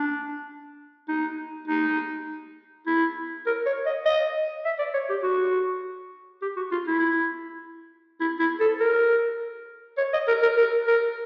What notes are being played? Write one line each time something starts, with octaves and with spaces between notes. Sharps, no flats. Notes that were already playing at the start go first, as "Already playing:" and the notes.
Already playing: D4
D#4
D#4
E4
A#4
C#5
D#5
D#5
E5
D5
C#5
G4
F#4
G4
F#4
F4
E4
E4
E4
A4
A#4
C#5
D#5
A#4
A#4
A#4
A#4